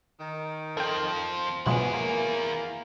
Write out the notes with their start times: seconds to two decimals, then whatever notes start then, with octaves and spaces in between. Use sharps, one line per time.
0.20 D#3
0.77 F3 C4 A4 G5
1.66 B2 F3 F#3 G#3 B3 E4 G#4
1.94 A#3